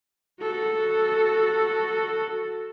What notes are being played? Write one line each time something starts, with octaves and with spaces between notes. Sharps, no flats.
F#4 A4